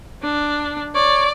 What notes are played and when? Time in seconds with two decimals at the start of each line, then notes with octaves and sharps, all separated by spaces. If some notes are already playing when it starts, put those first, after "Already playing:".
0.22 D4
0.95 C#5 D5